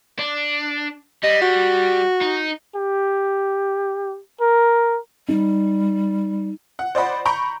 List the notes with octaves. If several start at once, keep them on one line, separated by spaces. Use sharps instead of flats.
D4
G3 D#5
F#4
D#4
G4
A#4
G3 D#4
F#5
C5 D5 D#5 F#5 B5
A#5 B5 C#6 G6 D7